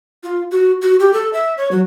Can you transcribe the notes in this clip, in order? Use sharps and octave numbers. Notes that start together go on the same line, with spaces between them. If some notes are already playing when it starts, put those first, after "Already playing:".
F4
F#4
F#4
G4
A4
E5
C#5
F#3